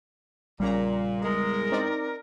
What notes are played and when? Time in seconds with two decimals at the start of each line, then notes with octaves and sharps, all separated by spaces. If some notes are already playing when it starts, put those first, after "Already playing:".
0.60 A#1 A#2 C#3 G3 A#5
1.22 E2 G#3 A#4
1.72 C4 D#4 D5